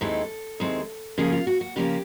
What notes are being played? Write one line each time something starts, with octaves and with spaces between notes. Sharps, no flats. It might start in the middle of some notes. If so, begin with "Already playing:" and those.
D#2 D#3 G#3 C4 E4 A4
D#2 D#3 G#3 C4 E4
C#3 F3 A#3 C#4 G#4
F4
F#4
F#4
C#3 F3 A#3 C#4 G4